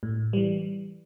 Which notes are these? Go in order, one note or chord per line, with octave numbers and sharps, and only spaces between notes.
A2
E3 G3